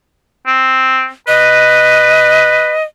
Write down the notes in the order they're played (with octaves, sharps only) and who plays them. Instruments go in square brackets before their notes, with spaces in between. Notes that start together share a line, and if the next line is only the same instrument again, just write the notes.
[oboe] C4
[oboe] B4 [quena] D#5